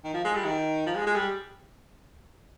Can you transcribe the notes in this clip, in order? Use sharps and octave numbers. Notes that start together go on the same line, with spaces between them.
D#3
F3
G#3
G3
D#3
F3
G#3
G#3
G3